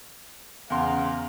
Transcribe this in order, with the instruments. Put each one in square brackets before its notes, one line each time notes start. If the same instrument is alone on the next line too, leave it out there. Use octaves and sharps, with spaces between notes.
[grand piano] E2 C#3 C6 [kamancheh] F5 A#5